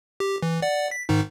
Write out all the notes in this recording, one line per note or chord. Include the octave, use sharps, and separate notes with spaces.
G4
E3
D5 F#5
B6
G#2 D#3 D#4